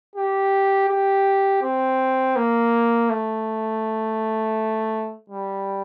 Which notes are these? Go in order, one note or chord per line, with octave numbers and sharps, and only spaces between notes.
G4
G4
C4
A#3
A3
G3